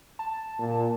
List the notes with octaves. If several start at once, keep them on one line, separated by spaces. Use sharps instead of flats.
A5
A#2